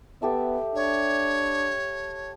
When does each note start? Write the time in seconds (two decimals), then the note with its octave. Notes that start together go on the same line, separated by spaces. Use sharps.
0.22 B3 G4 A4 E5
0.75 D4 C#5